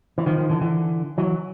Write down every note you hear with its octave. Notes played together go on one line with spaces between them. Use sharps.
E3
D#3 F3
D#3 F3
D3 E3
D3 E3
E3 F#3